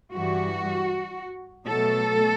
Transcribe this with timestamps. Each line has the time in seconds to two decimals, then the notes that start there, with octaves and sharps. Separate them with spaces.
0.12 G2 E3 G3 F#4
1.66 B2 F#3 A3 A4